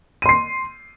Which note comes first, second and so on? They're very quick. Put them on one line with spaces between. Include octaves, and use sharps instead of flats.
D#7 C6 C7